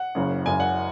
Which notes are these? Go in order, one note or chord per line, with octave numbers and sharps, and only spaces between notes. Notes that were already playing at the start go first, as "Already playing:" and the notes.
Already playing: F#5
F#1 F#2 C#3
F#1 F#2 C#3 G#5
F#5